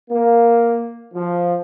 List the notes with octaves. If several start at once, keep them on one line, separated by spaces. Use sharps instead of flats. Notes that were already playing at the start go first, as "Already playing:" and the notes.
A#3
F3